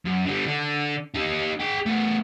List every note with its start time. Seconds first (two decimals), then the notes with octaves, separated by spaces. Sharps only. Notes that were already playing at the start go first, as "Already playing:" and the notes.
0.05 F#2
0.25 D3 G3
0.46 D3 D4
1.15 D#4 G4
1.61 G#4 G5
1.86 A3 B3